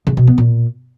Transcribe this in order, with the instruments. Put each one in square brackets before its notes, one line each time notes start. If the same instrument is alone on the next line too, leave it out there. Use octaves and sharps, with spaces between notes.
[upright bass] C#3
B2
B3
A#2